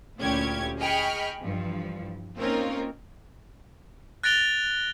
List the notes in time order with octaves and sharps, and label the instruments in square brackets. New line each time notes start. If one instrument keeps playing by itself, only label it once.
[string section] D2 A#2 C#4 E4 G4 G#6
G#4 D#5 G5 B5 C#6 F6
G2 E3 F3
A#3 C4 C#4 D#4 F4 A#4
[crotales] F#6 A6 A#6 D7 F7 G7